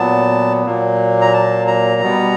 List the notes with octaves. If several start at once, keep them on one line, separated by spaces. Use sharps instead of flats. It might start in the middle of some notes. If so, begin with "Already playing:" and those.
Already playing: A#2 F#3 B3 A5
A#2 F#3 A#3
A#5
A5
A#5
B2 G3 B3